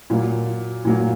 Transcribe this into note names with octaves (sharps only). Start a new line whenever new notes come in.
A#2 F#3 A#3
A#2 F#3 A#3